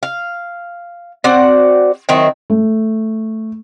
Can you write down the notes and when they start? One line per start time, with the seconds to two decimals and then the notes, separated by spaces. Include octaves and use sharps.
0.03 F5
1.24 C4 F#4 D5 F#5
2.09 D#3 F#3 C4 E4
2.50 A3